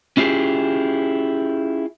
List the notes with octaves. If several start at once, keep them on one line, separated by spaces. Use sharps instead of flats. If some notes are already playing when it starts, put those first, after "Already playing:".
C#4 E4 F4 G4 G#4